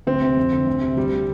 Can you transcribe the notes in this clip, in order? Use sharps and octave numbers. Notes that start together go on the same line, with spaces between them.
D2 C4
C3
F2
D3
D2
C3
D2 G3
C3